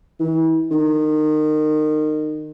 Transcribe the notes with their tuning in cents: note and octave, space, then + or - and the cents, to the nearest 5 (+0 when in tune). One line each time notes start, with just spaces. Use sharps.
E3 -35
D#3 -25